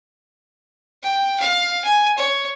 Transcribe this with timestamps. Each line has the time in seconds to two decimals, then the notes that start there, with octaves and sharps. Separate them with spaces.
1.03 G5
1.40 F5
1.84 G#5
2.17 C#5